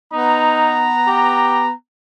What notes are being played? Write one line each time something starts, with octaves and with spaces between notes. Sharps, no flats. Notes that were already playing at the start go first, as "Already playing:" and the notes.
B3 D#4 A#5
G4